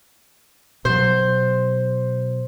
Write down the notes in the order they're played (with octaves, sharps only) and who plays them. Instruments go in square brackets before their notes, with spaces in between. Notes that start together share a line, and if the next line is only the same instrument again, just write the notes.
[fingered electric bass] B2 F#3 [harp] C5